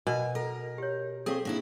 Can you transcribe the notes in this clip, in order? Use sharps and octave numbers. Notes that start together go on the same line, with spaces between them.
B2 A#4 G#5
A4 A#4
G4 C#5
C4 G#4 A4 F5 C#6
A#3 D4 E4